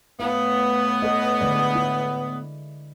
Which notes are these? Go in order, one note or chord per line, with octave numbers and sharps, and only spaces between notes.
A2 B3 F5
A4 B4 D#5
D3 G#3 D5
E4